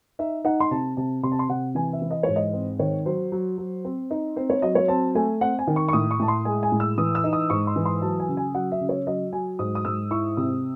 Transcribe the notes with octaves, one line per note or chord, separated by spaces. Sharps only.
D#4 E5
D#4 F#5
C6
C3 A5
C3 A5
C3 C6
A5
C6
C3 F#5
E3 G#5
E5
E3
D#5
G#2 C#5
D#5
C4
D#3 C#5
F#3 C5
F#3
F#3
C4
D#4
C4 C5
C#5
F#3 D#5
C#5
C4 A5
A3 G#5
C4 F#5
G#5
D#3
C#6
C#6
A2 D#6
C#6
A2 A5
C6
G#3 G#5
G#5
A2
E6
E3 D#6
E6
D#4
D#6
G#2 C#6
C6
E3
C6
F#3 A5
G#5
C#3
G#5
F#3 F#5
E5
C#3
C#5
F#3 D#5
F#3 G#5
G#2 D#6
D#6
G#2 E6
E4 C#6
C3 D#6